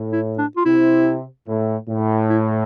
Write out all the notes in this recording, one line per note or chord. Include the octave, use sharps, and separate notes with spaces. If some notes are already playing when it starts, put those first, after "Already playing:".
Already playing: A2
E4
D4
F4
C3 E4
A2
A2
E4